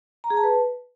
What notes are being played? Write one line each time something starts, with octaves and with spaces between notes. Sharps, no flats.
A#5
G#4
A5
B4